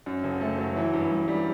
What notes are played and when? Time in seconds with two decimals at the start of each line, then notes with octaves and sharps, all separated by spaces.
0.06 F#2
0.24 F#1
0.41 A3
0.58 F#3
0.76 E3
0.93 G2
1.11 G2
1.28 G3